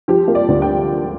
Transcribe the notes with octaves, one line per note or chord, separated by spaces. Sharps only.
F3 G4
A#3
D5
D2
G5